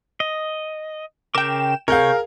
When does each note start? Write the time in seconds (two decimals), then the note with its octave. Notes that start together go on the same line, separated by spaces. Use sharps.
0.20 D#5
1.35 C#3 A#4 G5 D6 E7
1.88 C3 G#4 A#4 C#5 F5 G6